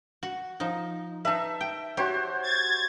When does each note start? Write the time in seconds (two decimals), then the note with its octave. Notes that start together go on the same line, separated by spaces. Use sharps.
0.23 F#4
0.60 F3 D#4
1.25 D#4 B4 E5 A5
1.61 G5
1.97 F#4 G4 C5 C#5
2.42 G#6 A6